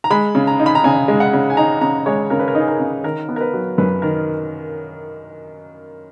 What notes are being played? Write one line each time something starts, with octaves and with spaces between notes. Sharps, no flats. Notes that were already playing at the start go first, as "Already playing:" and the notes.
A#5
G#3 B5
C#3
A#5
D#4
B5
A#5
C#3 G#5
G#3
F#5
C#3
G#5
D#4 A#5
C#3 A#5
G#3 C#5
C#3 A#4
B4
A#4
D#4
G#4
A#4
C#3
D#3 A#4
B3
A#4
B4
F#3
F#2 B4
D#3 A#4